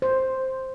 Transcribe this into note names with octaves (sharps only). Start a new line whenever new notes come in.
C5